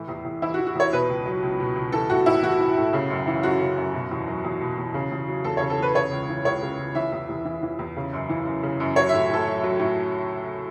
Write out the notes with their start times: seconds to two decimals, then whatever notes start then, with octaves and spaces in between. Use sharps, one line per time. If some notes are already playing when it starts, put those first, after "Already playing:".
Already playing: A2 E3
0.08 E2
0.25 E2
0.42 E3 E4
0.54 F#4
0.59 E3
0.67 F#4
0.75 E2 C#5
0.93 B2 B4
1.09 C#2
1.26 F#3
1.42 C#2
1.60 B2
1.76 C#2
1.92 E3 A4
2.10 A2 F#4
2.26 A2 E4
2.43 E3 F#4
2.60 E3
2.77 A2
2.93 C#3
3.10 F#2
3.27 E3
3.43 F#2 F#4
3.60 C#3
3.77 F#2
3.93 B2
4.11 E2
4.28 F#3
4.45 E2
4.61 B2
4.78 E2
4.94 C#3
5.12 E2
5.28 F#3
5.44 E2 A4
5.57 C#3 C#5
5.70 A4
5.79 E2 B4
5.95 C#3 C#5
6.11 C#2
6.29 E3
6.45 C#2 C#5
6.62 C#3
6.78 C#2
6.95 E3 E5
7.12 E2
7.29 E2
7.45 E3
7.63 E3
7.79 E2
7.96 C#3
8.13 F#2
8.29 E3
8.46 F#2
8.63 C#3
8.80 F#2
8.96 F#3 C#5
9.09 A2 E5
9.30 A2 A4
9.47 F#3
9.64 F#3
9.80 A2